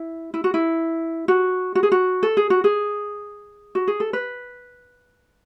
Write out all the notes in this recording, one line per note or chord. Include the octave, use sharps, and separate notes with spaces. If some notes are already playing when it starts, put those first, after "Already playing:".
Already playing: E4
E4
F#4
E4
F#4
F#4
G#4
F#4
A4
G#4
F#4
G#4
F#4
G#4
A4
B4